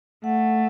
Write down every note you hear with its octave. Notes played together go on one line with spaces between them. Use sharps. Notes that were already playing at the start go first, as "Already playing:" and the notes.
A3 F#5